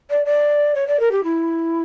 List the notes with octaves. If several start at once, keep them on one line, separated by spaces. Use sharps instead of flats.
D5
D5
C#5
D5
A#4
G4
E4